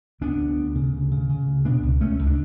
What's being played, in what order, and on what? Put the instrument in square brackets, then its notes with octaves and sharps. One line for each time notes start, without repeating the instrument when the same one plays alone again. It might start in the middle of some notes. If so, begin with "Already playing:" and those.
[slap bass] D2 B3 D4
D2
D2
C#3
D2
C#3
C#3
D2
B2 B3 D4
C#2
C#2 A3 C#4
C#2
D4